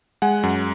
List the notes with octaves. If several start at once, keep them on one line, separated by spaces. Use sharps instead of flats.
G#3 F#5 G#5
F#2